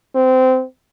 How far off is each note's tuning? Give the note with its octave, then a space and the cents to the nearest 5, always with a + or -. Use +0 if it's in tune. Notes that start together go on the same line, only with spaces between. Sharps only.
C4 -20